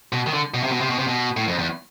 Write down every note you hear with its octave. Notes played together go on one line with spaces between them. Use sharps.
B2
D#3
D3
B2
C3
B2
C3
B2
C3
B2
A2
F2
E2